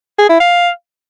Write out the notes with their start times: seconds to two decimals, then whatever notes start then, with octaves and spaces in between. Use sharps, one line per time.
0.18 G#4
0.29 E4
0.40 F5